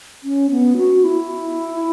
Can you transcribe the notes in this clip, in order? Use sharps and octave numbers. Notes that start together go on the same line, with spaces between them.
C#4
B3
F#4
E4